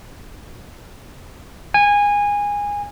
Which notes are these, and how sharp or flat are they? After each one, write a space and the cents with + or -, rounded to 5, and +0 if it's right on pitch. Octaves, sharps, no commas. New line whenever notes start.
G#5 -20